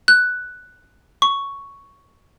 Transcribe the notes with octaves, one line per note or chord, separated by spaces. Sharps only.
F#6
C#6